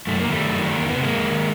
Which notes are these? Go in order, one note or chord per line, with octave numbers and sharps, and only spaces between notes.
F#2 A3
D#3 A#3
G3 A3
F#2
D#3
E2 A#3
C3 B3
G#3 A#3
E2
D#3